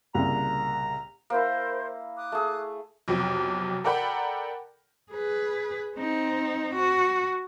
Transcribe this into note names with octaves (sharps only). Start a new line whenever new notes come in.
C2 A#2 C#3 A#5
A#3 E4 A#4 C5
D6 D#6 F#6
A3 G#4
B1 F2 C3
A4 A#4 D5 F#5 G5 B5
G#4 B4
C4 D#4
F#4